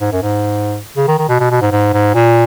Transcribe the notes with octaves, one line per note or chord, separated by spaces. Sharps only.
G#2
F#2
G#2
C#3
D#3
D#3
B2
B2
B2
G#2
G#2
G#2
A#2